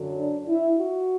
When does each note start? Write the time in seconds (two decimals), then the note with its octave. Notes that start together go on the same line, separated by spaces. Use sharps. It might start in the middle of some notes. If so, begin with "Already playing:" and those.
Already playing: F#2 D3 F#3
0.19 D4
0.48 E4
0.78 F#4